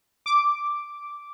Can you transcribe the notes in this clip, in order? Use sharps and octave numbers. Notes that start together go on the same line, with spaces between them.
D6